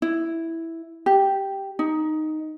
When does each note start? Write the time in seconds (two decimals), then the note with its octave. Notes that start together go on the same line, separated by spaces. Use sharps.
0.02 E4
1.06 G4
1.79 D#4